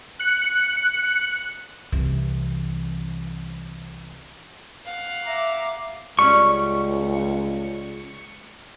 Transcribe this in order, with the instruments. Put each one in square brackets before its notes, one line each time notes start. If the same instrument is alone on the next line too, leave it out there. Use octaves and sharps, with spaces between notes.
[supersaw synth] F#6 C#7
[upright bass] C2 E3
[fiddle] F5 F#5
[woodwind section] E5 A#5 D6
[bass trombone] C#2 [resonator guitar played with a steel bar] G3 C#4 [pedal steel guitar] C#6